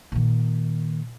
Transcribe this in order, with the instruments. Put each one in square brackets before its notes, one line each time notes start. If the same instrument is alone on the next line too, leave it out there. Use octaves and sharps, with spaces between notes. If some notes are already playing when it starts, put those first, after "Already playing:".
[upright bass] A#2 D#3